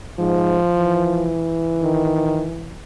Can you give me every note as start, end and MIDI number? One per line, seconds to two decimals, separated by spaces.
0.20 0.58 44
0.20 1.30 53
0.78 2.75 52
1.83 2.49 51